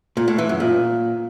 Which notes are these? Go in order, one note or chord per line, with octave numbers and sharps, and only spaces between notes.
A#2
A2
E3
F#2
A#2